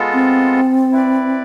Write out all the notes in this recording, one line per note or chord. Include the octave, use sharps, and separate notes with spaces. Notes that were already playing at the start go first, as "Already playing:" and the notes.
Already playing: G#3 B3 F4 A4
C4
E4 B4 D5